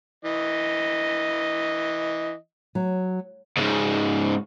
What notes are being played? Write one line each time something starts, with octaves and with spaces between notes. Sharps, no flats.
E3 D#5
F#3
G#2 C#3